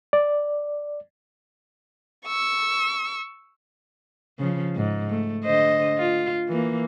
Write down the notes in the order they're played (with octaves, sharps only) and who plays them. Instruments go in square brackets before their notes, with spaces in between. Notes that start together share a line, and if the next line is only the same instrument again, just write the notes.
[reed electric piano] D5
[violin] C#6 E6
[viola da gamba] C#3 F3
G#2
A3
D3 C5 D#5
F4
E3 A#3